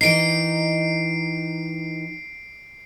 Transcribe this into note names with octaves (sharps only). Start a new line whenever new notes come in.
D#3 E3 D#4 C7 D7